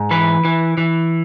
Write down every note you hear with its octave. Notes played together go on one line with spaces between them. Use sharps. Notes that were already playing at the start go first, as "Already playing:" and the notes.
Already playing: G#2
E3 B4
E3
E3